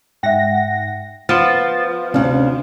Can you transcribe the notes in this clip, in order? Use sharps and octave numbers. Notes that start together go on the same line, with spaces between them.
G#2 E5 F#5 G5 A#6
F3 B3 F6 A6
D2 C3 C#4 D4 F5